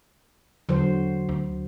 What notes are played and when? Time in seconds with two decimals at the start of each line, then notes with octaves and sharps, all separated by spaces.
0.69 E2 D3 F#3 C5
1.29 D2